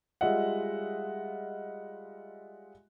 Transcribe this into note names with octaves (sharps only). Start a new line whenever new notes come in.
G3 G#3 F4 D#5 E5 F#5